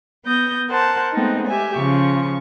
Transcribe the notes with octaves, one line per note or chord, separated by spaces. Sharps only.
B3 D#6 G6 A#6
A#4 C5 F#5 A5
G#3 A3 B3 C4 D#4
G4 E5 G#5
C#3 F3 C#6